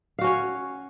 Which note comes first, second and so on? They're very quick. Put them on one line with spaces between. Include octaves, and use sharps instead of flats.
F5 F#4 C#4 C#5